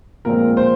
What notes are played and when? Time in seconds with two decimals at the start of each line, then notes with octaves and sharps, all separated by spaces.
0.25 A#2 F3 G#3 C4 A#4
0.57 C5